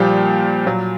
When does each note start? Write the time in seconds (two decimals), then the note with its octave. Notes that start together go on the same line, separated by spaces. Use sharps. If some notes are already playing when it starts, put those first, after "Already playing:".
Already playing: A#2 F3 G3 G4
0.66 A#2 F#3